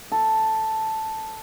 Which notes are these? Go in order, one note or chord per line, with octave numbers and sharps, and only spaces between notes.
A4